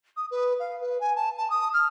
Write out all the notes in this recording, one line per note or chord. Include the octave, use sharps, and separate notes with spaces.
D#6
B4
F5
B4
G#5
A5
A5
D#6
F6